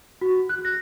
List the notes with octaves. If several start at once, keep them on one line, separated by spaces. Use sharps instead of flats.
F#4
F#6
A#6